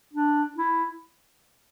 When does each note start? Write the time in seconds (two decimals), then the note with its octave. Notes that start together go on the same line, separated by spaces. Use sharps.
0.13 D4
0.57 E4